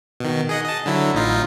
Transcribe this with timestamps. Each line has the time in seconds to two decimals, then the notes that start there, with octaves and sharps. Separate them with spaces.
0.20 B2 D#3
0.49 G#4 D#5 F#5
0.64 D#5 A5
0.86 D3 F#3 E4
1.15 A1 D#4 F4